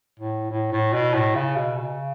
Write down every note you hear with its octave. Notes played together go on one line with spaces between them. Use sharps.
A2
A2
A2
B2
A2
C#3
B2
C#3